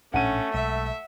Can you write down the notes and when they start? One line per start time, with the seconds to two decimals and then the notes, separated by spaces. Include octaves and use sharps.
0.14 A#1 A2 A3 C#4 D4 F#5 D#7
0.54 B1 G#3 E5